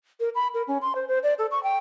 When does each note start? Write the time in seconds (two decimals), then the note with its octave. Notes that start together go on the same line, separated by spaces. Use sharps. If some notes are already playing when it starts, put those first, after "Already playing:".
0.20 A#4
0.35 B5
0.54 A#4
0.68 C#4
0.82 C6
0.95 C5
1.08 C5
1.23 D5
1.39 A4
1.51 C#6
1.63 G5